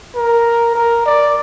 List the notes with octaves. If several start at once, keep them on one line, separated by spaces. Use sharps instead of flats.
A#4
A#4
D5